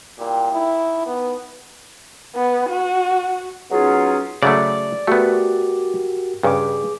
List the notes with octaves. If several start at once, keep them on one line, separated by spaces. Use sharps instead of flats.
A#2 G3 E4 G4
D#4 E4 A4 A#4
B3
B3
F#4
F#3 B3 C#4 D#4 F4 G#4
C#3 F#3 A3 D5
A3 B3 F#4 G4 A#4
G2 C#3 G#4 D6